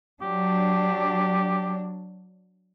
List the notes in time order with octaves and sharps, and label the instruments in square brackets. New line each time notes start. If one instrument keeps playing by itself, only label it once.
[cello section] F#3 D4 [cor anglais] G4